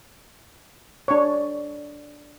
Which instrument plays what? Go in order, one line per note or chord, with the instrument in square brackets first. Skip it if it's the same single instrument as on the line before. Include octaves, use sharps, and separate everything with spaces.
[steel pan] D4 C#5